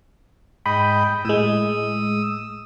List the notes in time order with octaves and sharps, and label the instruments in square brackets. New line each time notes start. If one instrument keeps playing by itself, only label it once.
[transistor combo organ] G#2 D#5 G5 [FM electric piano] B5
[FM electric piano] A2 G#3 [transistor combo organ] D#6 E6